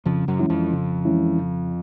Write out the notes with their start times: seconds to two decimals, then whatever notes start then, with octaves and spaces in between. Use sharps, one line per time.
0.05 F2 C#3 F3
0.28 F#2 F#3
0.39 E3 G#3 C#4 E4
0.50 F2 F3
0.72 C#3
1.05 E3 G#3 C#4 E4
1.38 C#3